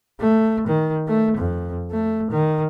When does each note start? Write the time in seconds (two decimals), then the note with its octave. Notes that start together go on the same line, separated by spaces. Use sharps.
0.20 A3
0.67 D#3
1.08 A3
1.37 F2
1.92 A3
2.31 D#3